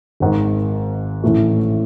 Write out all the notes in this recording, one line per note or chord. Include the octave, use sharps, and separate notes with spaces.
G#1 G#2 D#3
A1 A2 E3 A3